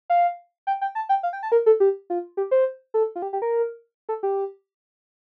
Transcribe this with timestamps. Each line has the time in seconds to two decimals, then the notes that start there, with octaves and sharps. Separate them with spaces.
0.10 F5
0.67 G5
0.81 G5
0.95 A5
1.09 G5
1.23 F5
1.33 G5
1.43 A5
1.52 A#4
1.66 A4
1.80 G4
2.10 F4
2.37 G4
2.51 C5
2.94 A4
3.16 F4
3.22 G4
3.33 G4
3.42 A#4
4.09 A4
4.23 G4